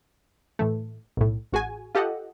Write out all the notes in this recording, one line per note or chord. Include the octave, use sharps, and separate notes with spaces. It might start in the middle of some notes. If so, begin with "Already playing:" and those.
A2 E3 A3
B1 A2
A1 F#4 G#4 G#5
F4 G4 A4 D#5 F#5